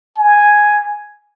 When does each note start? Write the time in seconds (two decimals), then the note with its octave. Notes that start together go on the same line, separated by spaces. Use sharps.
0.18 G#5